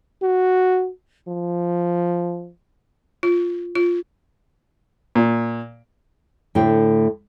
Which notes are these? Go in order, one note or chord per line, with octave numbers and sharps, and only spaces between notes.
F#4
F3
F4
F4
A#2
A2 D3 A3 C5 G5